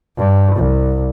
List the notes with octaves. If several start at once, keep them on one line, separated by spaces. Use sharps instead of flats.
G2
C2